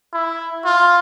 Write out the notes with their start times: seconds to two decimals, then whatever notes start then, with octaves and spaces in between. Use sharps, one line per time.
0.13 E4
0.65 F4